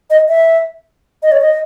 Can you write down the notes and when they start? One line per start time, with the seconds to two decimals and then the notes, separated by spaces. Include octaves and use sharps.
0.10 D#5
0.28 E5
1.23 D#5
1.32 C#5
1.41 D#5